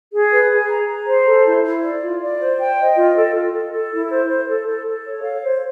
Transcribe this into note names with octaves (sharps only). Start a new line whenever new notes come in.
G#4
B4
G#4
A#5
A#5
C5
A4
E4
E4
D5
F4
D5
C5
G5
D#5
F4
A4
F4
A4
A4
E4
C5
C5
A4
A4
A4
C#5
F5
C5